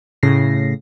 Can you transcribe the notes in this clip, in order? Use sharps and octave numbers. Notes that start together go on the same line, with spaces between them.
A2 C#3 A#6 C7